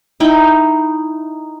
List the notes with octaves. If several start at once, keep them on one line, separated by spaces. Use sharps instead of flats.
D#4 E4 G5 B5